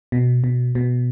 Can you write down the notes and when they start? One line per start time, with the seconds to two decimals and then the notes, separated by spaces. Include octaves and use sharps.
0.12 B2
0.44 B2
0.75 B2